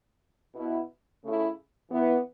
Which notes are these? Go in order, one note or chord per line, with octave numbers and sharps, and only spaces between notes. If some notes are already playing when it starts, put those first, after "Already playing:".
B2 B3 E4
C#3 A3 C#4 E4
E3 B3 E4